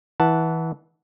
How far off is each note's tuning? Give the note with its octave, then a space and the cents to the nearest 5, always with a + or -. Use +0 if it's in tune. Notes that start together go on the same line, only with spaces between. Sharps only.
E3 -20 F#5 +0 A5 +0